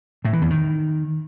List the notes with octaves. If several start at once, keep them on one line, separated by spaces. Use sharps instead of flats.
A2
E3
E2
D#3